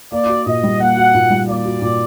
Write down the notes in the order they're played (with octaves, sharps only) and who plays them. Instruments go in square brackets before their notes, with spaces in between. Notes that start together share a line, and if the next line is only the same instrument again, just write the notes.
[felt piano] A#3 [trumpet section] D5
[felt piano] F#4
[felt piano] A#2 [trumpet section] D#5
[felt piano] G3
[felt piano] A#3 [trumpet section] F#5
[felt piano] F#4
A#2
G3
[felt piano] A#3 [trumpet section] D5
[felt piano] F#4
A#2